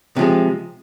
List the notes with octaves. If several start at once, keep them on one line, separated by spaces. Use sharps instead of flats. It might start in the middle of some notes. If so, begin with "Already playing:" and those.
C3 F3 G#3